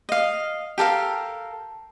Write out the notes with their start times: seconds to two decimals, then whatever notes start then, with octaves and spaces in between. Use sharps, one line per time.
0.09 D#5 F5
0.78 G4 A4 A#4 F5